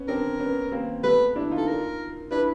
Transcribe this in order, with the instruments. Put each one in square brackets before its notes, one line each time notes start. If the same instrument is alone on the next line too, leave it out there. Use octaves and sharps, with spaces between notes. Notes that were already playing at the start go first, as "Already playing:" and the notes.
Already playing: [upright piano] B3 C#4
[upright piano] C4 D4 [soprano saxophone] A#4
[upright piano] B3 C#4
A#3 C4
[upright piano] A3 B3 [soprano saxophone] B4
[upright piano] D4 E4
D#4 F4
[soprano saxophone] A4
A#4
[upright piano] D4 E4 [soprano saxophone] B4